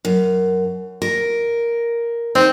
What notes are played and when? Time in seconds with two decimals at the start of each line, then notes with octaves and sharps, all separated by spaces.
0.05 F#2
1.02 A#4
2.35 C4 D#4